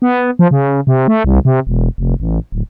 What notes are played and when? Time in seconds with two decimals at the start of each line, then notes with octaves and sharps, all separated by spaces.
0.02 B3
0.39 F3
0.51 C#3
0.87 C3
1.08 A3
1.24 C2
1.45 C3
1.67 E1
1.98 F1
2.20 A1
2.52 D1